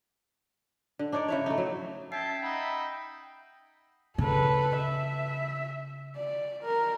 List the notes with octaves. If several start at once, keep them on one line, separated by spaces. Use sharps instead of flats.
D3
D4 D#4 C#5 D5
C#3 E4 C#5
A3 D#4
F#3
C#4 E5 G5 A5 G#6 C7
D#4 F#5 B5
C#3 A4 B4
E5
D5
A#4